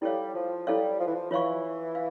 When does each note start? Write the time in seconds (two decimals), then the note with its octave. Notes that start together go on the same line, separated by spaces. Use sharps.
0.02 G3 E4 A4 C#5 F5
0.34 F3
0.67 G3 E4 A4 C#5 F5
0.99 F3
1.07 E3
1.15 F3
1.31 E3 F4 C#5 F5 C#6
1.95 F5